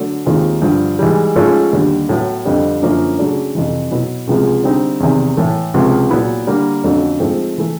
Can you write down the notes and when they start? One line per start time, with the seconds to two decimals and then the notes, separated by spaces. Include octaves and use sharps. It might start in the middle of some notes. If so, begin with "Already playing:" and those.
Already playing: D3 F#3 A3 D4
0.26 D#2 D#3 G#3 C4 F4
0.62 G2 D3 F3
0.99 G#2 E3 G3
1.36 G#2 F3 A3 C#4 F4
1.73 D#2 D3 G3
2.09 A2 F#3 B3
2.45 F2 D3 G3 C4
2.82 F#2 D3 F3 A#3 C#4
3.19 C#3 F#3 A3 D4
3.55 F2 C3 E3
3.91 B2 F#3 B3 E4
4.27 C#2 C3 F3 G#3 B3
4.64 D3 G3 C4 D#4
5.00 E2 C3 D#3
5.37 A2 E3 A3
5.74 C#2 C3 F3
6.10 A#2 F#3 B3 E4
6.47 D3 G3 A#3
6.84 F2 D3 F#3 A3 C#4
7.20 G#2 F3 A3 C4
7.58 E3 A3